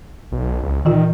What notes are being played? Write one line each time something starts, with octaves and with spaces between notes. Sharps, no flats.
B1
C#2
A#2 D#3 E3 F4